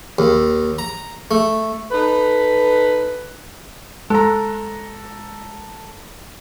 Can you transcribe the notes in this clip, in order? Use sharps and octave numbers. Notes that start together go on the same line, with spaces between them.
D#2
A#5
A3
D#4 A4 B4
G#3 A4 A#5